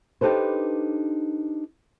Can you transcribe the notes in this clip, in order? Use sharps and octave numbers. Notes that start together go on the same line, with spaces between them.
D4 D#4 G4 A4 B4 C5